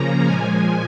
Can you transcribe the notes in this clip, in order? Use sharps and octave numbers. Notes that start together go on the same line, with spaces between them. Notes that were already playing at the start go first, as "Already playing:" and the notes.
Already playing: C#3 F3 A#3 C#4 A#5
A#2 F3 G#3 G#5